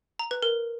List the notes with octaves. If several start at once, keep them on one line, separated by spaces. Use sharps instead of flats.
A#5
B4
A#4